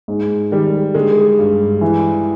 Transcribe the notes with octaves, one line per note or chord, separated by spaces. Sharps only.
G#2
D#3 G3
D3 G#3
G2
E3